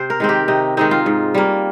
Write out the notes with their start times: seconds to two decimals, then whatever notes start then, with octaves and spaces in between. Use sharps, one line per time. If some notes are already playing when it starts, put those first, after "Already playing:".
Already playing: C3 C5
0.10 A#4
0.20 D#3 G#3 C4
0.29 G4
0.48 C3 D#4
0.77 D#3 G#3 C4 D#4
0.91 F4
1.06 G#2
1.34 G3 A#3